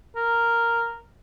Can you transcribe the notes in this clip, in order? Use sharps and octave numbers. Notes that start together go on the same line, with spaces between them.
A#4